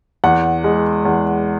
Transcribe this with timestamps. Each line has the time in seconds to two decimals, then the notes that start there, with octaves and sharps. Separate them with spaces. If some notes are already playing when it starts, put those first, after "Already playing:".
0.24 E2 F#5
0.64 G#3
1.05 E2